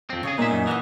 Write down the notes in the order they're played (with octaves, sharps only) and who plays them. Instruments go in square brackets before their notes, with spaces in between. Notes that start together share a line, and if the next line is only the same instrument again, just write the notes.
[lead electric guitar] F2 C4
[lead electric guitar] C#3 G#4 [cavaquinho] C#5 D#5
[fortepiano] A#2 [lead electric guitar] G#3 E5 [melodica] D#4 G#5
[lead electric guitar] F#2
[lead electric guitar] E3 [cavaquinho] D#5 F5 F#5